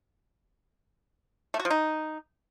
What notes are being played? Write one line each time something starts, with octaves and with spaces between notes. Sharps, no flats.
A3
F#4
F3
D#4